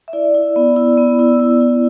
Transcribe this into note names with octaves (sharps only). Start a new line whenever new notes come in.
E5
E4 D5
E4
B3
E4
B3
E4
B3
E4